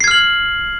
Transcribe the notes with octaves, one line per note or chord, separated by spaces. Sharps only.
F6 G#6 C7 F#7